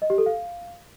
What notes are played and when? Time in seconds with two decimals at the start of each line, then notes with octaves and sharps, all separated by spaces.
0.02 D#5
0.10 G4
0.18 A4
0.26 F5